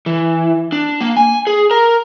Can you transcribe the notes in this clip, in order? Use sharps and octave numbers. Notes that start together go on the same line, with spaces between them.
E3
D4
A#3
G#5
G#4
A#4